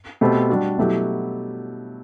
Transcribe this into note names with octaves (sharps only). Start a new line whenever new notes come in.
B2 A3 C4 G4
G3 D4 F#4
B2 F#3 A3 E4 G4